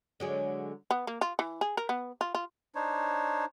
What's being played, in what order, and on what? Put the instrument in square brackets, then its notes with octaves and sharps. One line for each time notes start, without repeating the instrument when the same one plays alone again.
[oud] D3 F#3 G#3
[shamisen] B3
A#3
F4
E3
G#4
A#4
B3
F4
F4
[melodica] D4 D#4 C5 C#5